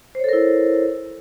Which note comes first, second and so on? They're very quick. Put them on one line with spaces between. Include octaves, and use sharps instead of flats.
C5 C#5 A4 A#4 E4